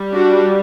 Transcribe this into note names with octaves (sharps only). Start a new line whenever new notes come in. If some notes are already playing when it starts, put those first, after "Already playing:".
Already playing: G3
D4 F#4